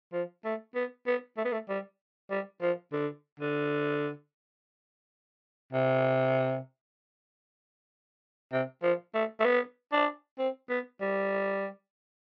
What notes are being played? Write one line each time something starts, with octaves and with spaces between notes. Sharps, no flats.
F3
A3
B3
B3
A3
B3
A3
G3
G3
F3
D3
D3
C3
C3
F3
A3
A3
B3
D4
C4
B3
G3